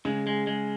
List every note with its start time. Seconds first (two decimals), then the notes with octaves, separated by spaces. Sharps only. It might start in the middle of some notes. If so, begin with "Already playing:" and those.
0.05 C#3 G#3
0.27 G#3
0.47 G#3